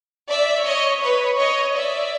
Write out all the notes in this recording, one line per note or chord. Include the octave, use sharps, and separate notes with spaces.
D5 E5
C#5 D#5
B4 C#5
C#5 D#5
D5 E5